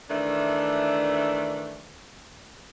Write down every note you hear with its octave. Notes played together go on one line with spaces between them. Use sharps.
D#3 E3 A3 D4